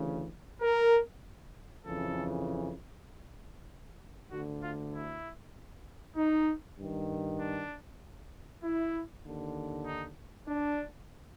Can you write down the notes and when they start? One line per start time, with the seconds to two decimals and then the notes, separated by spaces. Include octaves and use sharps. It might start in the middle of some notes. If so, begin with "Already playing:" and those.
Already playing: D2 C#3 E3
0.62 A#4
1.86 F2 C#3 E3 A4
4.31 D2 D3 F#4
4.62 F4
4.94 E4
6.16 D#4
6.77 G2 D#3
7.39 D4
8.63 E4
9.24 D#2 D3
9.85 D#4
10.47 D4